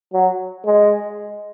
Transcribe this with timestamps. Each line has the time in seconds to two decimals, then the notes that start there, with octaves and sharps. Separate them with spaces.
0.14 F#3
0.65 G#3